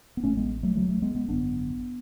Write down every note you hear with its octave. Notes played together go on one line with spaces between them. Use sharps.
B3
A1 A2 A3 C#4
G#3 B3
F#3 A3
C#2 C#3 F#3 A3
F#3 A3
G#3 B3
G#3 B3
G#1 F#2 D3 B3 D4